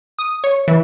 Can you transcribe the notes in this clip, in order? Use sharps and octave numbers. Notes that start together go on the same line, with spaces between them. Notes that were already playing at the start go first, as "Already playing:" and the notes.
D#6
C#5
E3